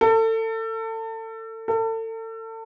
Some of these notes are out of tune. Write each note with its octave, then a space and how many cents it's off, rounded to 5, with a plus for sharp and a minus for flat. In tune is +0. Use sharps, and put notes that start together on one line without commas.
A4 +30
A4 +35